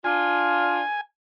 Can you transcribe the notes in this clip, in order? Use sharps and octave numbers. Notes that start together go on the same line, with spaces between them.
D4 F4 G#5